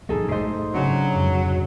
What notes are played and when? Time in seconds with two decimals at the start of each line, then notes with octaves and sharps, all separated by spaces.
0.09 A1 D2 F#3 D#4 G#4 A4
0.31 G#2 A3 A4 C5 D#5
0.74 C#3 F#3 D4
1.16 F2 G#2 C3